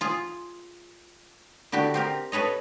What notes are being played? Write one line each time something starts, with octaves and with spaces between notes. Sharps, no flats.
F4 G#4
D3 E4 F#4 G4
C4 G4 A#4
A4 B4 C#5 D#5